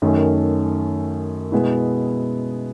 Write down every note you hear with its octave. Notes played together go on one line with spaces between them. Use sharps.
F#2 D#3 A3 C#4
B2 G#3 B3 E4